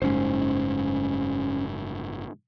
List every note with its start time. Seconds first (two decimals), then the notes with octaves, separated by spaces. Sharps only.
0.02 F#1 G#2 C#4 C5